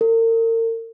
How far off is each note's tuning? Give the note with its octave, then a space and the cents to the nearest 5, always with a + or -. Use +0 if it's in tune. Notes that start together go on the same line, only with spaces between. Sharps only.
A#4 -40